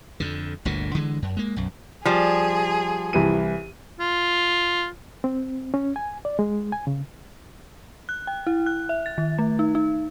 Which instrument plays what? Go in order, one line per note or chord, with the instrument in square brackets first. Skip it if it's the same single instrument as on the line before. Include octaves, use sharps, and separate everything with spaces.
[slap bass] F2 D3
G1 D2 A#2 D3
D3 E3 G3 G#3
F#2
G#3 A#3
B1 F#2
[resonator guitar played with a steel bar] F3 G3 [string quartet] G#4
[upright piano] C2 E3 D#7
[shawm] F4
[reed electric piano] C4
C#4
G#5
D5
G#3
G#5
C#3
[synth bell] F#6
G5
E4
F#6
E5
A6
D#3
A3
D#4
D#4